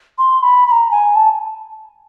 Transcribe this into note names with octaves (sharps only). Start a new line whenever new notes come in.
C6
B5
B5
A#5
G#5
A5